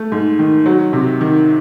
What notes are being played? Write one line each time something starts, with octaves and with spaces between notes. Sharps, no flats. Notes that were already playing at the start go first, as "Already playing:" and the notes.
Already playing: A3
G#2
D#3
F#3
C3
D#3